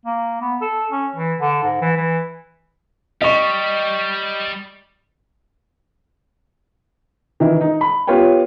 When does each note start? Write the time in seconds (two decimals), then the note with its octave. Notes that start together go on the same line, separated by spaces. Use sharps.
0.06 A#3
0.41 B3
0.61 A4
0.91 C#4
1.16 E3
1.40 D3
1.63 G#2
1.81 E3
1.97 E3
3.22 G3 D#5 C#6
7.40 D#3 E3 E4
7.61 D#4
7.81 B5
8.07 B3 F4 G4 B4 C#5 G5